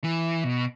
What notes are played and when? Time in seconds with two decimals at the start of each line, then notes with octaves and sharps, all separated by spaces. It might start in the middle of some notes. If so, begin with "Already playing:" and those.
0.04 E3
0.44 B2